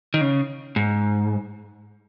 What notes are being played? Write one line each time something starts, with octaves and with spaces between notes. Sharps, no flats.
D#3
C#3
G#2